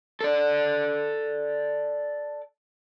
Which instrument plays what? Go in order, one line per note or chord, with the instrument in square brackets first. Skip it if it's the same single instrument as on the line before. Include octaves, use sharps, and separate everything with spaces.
[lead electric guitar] A4 D5